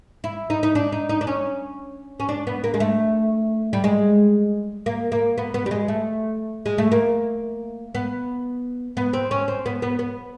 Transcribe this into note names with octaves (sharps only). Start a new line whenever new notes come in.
E4
D#4
D#4
D4
D#4
D#4
D4
C#4
C#4
D4
B3
A#3
G#3
A3
G3
G#3
A#3
A#3
B3
B3
G3
G#3
A3
G#3
A3
A#3
B3
B3
C4
C#4
C4
B3
B3
B3